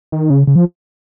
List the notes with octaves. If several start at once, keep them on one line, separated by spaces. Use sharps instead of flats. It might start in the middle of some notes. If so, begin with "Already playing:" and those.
D#3
C#3
C#3
F3